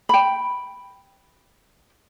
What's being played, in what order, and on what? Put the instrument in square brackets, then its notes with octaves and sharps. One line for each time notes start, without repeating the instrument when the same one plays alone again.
[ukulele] G5 B5